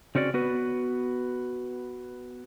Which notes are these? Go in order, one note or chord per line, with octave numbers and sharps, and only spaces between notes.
C#3 C4 C#4 F#4 D5
B3 F#4 B4